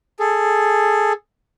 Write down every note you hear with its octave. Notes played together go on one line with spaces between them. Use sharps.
G#4 A4